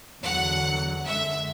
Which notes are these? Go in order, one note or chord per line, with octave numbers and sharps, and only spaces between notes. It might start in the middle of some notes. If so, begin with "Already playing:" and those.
E2 D3 F#3 F#5
F#2 D3 G#3 E5